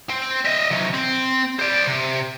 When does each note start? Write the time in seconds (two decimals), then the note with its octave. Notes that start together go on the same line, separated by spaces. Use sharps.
0.09 C4
0.45 D#5 E5
0.71 C3 F#3
0.93 C4
1.60 C5 D5
1.87 C3